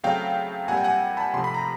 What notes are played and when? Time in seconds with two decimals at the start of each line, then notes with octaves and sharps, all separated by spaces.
0.03 C#3 F#3 A3 C4 F5 G5
0.68 A#2 G3 C4 F#5 G#5
0.77 G5
0.84 F#5 G#5
1.17 A5 B5
1.34 C3 F3 A3 C4 C6
1.44 B5
1.54 A#5